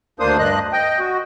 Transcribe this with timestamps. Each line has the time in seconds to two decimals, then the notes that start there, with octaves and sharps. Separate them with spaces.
0.20 D2 A#3 D4 C5 D#6
0.39 G2 D4 D#5 F#6
0.73 D#5 G5
0.99 F#4